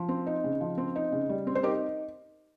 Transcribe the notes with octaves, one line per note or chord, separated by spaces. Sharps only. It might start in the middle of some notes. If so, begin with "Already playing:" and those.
Already playing: F3
C4
D#4
C#3
F3
C4
D#4
C#3
G3
C4
C5
D#4 G4 A#4